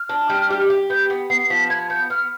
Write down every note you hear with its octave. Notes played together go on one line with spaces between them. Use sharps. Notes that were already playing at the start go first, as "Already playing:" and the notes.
Already playing: F6
D4
G3
G4
G4
B3 G6
B3
B3 C7
F3 B6
B3 G#6
B3 G6
B3 F6